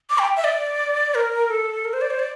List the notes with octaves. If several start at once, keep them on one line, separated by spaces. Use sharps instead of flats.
D6
G5
E5
D5
A#4
A4
A#4
C5
D5
C5
D5